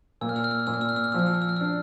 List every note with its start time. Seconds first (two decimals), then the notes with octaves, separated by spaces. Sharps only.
0.21 A#2 E6
0.29 F6
0.36 E6
0.44 F6
0.51 E6
0.59 F6
0.67 A#2 E6
0.74 F6
0.81 E6
0.89 F6
0.96 E6
1.04 F6
1.12 F3 E6
1.19 F6
1.26 E6
1.34 F6
1.42 E6
1.49 F6
1.56 E6
1.61 D4 F6